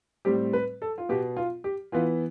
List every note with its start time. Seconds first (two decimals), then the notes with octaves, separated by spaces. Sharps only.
0.25 A2 G3 C4 G4
0.53 B4
0.82 A4
0.98 F4
1.09 B2 B3 G4
1.37 F4
1.64 G4
1.92 E3 B3 F4